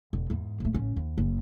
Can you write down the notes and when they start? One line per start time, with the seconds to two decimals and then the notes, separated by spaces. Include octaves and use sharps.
0.13 E1
0.30 E2 G#2
0.60 D#1 A3
0.74 A1 C#4
0.96 D#2
1.18 F#1